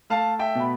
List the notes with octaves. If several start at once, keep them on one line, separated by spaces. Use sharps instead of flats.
A3 F5 A5
E5 G5
B2 B5